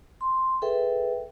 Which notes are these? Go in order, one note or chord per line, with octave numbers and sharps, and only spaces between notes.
C6
G#4 A4 B4 E5 G5